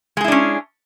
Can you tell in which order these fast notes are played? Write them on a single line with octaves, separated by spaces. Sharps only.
G#3 G#4 E4 D4 C#4